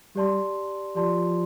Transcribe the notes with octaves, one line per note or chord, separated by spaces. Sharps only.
G3 G4 D5 A5 C6
F3 G4 D5 A5 C6